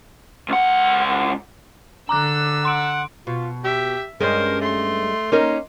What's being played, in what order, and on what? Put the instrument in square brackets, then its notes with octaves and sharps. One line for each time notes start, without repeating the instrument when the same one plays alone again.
[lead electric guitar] C#2 F#5
[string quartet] D3 E6 [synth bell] A#5 D6 F#6
[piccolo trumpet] F#5 [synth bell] C6 D7
[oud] B2 [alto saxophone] F4
[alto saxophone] G4 [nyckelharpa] E5
[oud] G2 G#3 C#4 [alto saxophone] A#4 [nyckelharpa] C5
[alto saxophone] A3 [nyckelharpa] C6
[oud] A#3 D#4 A#4 [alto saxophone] C#4